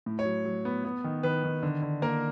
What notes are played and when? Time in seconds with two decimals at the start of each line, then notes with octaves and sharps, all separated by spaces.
0.06 A2
0.19 C#5
0.25 F#3
0.45 F#3
0.65 B3
0.85 B3
1.04 D#3
1.23 D#3 B4
1.44 D#3
1.63 D3
1.82 D3
2.02 A#3 A#4